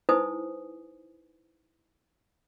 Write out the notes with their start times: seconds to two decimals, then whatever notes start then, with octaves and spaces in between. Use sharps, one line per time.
0.09 D#4 E4 B4 C5 G#5 D#6